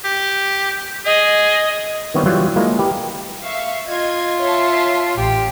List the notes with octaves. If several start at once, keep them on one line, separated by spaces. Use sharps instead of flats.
G4
G#4 D#5
D#3 G3 B3 C4 E4 C#5
E3 F#3 G3 F4
G#3 A#3 E4 F4
G4 B4
E5 F5 C#6
F4 D#5 G#6
C#5 E5 A5
A1 G4